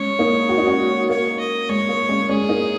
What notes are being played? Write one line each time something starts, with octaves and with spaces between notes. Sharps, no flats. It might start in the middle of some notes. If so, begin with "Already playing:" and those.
Already playing: G#3 C#4 C#5
A#3 D#4
F#4
D#4
C#4 F#4
A#3 C#5
D#5
G#3 C#5
A#3
G#3 C#4
G#3 C#4 G#4
A#3 D#4